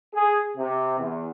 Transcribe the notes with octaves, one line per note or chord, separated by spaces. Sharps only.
G#4
C3
E2